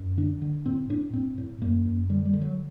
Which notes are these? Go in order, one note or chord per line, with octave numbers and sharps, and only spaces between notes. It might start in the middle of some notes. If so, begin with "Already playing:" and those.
Already playing: F#2
D3 D4
D3
A2 C4
A2 D4
A2 C4
A2
F#2 A#3
F#2
D3 G3
G3
D3
F#3